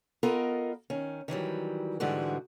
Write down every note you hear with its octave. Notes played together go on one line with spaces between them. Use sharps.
B3 F4 A4 A#4 D#5
D#3 C#4
D#3 E3 F#3 G3
G#2 D3 E3 G3 G#3 F#4